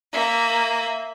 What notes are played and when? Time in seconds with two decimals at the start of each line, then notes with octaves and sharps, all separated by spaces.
0.12 A#3 E5